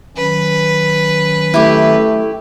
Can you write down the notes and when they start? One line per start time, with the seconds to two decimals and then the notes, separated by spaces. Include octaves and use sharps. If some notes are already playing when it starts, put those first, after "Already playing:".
0.17 D#3 F#3 C#4 B4
1.54 A3 E4 G4